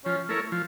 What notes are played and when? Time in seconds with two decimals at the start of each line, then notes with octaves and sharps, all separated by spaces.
0.05 F3 C#4
0.29 A3 E4 A#4 C#5
0.52 F3